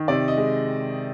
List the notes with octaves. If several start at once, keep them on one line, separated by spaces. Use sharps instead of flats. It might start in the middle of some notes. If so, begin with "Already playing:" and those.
Already playing: D#3
C3 D5
D#5
G#3